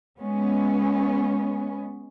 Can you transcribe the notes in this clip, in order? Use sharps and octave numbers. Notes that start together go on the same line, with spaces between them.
G#3 B3 C#4